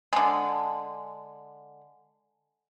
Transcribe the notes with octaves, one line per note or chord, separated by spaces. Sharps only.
D3 G#3